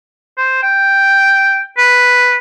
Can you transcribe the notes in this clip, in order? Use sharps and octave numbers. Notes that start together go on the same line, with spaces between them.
C5
G5
B4